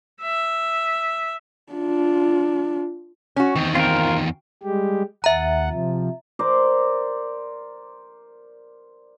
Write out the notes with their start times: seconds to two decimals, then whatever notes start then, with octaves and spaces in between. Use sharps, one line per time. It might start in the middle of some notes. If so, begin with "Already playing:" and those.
0.21 E5
1.73 D4 F4
3.36 C#4 F#4
3.56 E2 D#3 C4
3.75 C4 F4 A#4
4.63 G3 G#3 G4
5.24 D#2 E5 F#5 A#5
5.70 C3 F3
6.39 A#4 C5 D5